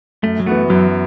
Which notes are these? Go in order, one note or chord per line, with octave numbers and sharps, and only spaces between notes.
F#2 A3
F#3
E3 A3 B3 F#4
F#2 F#3